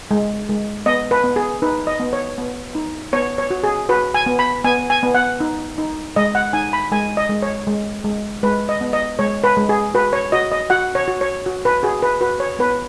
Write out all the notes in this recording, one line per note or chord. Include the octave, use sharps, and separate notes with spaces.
G#3
G#3
B3 D#5
B4
B3
G#4
D#4 B4
D#5
B3
C#5
B3
D#4
B3 C#5
C#5
F#4
G#4
F#4 B4
G#5
B3
B5
B3 G#5
G#5
B3
F#5
D#4
D#4
G#3 D#5
F#5
D#4 G#5
B5
G#3 G#5
D#5
G#3
C#5
G#3
G#3
G#3 B4
D#5
B3
D#5
G#3 C#5
B4
G#3
G#4
F#4 B4
C#5
F#4 D#5
D#5
F#4 F#5
C#5
F#4
C#5
F#4
B4
F#4 G#4
B4
F#4 B4
C#5
B3 B4